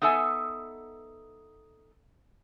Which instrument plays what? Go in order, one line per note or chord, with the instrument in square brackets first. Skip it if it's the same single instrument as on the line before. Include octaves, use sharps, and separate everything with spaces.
[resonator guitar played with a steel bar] B3 D#4 A4 E5 G#5